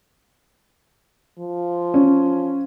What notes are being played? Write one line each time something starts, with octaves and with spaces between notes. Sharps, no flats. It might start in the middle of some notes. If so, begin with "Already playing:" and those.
F3
C#4